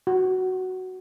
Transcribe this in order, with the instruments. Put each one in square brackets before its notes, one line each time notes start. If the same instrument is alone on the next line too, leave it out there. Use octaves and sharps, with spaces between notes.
[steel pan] F#4